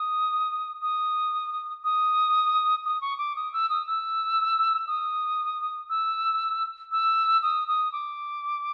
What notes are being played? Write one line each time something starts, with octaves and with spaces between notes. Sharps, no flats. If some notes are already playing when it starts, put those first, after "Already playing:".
Already playing: D#6
D#6
D#6
D#6
C#6
D6
D#6
E6
D#6
E6
D#6
E6
E6
D#6
D#6
D6